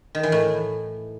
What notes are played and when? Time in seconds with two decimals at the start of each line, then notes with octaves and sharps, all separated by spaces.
0.15 D#3
0.23 E3
0.32 A2